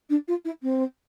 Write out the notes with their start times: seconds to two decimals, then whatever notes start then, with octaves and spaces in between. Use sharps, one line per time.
0.09 D4
0.28 F4
0.45 E4
0.62 C4